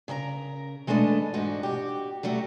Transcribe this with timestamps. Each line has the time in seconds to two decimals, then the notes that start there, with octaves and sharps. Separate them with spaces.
0.08 C#3 A#4 D5 A#5
0.87 E3 G#3 A3 D4 D#5
1.34 G#2 D4 D#4 F#4
1.63 F#4 G4
2.23 F#3 G3 A3 F#4